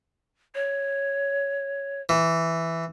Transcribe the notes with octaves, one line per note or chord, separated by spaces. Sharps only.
C#5
E3